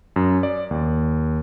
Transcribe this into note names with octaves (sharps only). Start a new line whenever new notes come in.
F#2
D5
D#2